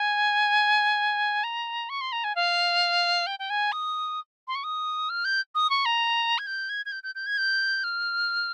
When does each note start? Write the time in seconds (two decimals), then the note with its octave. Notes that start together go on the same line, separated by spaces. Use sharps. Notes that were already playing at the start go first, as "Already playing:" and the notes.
Already playing: G#5
1.44 A#5
1.89 C#6
2.01 C6
2.12 A#5
2.24 G#5
2.35 F5
3.27 G5
3.39 G5
3.50 G#5
3.72 D#6
4.48 C6
4.55 C#6
4.64 D#6
5.09 F6
5.25 G6
5.55 D#6
5.70 C#6
5.85 A#5
6.38 G#6
6.47 G6
6.69 G#6
6.86 G#6
6.92 G6
7.03 G6
7.15 G6
7.26 G#6
7.38 G6
7.84 F6